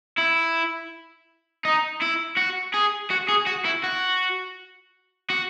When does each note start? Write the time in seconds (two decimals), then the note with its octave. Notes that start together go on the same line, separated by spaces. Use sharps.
0.18 E4
1.65 D#4
2.02 E4
2.37 F#4
2.74 G#4
3.10 F#4
3.29 G#4
3.47 F#4
3.65 E4
3.84 F#4
5.30 F#4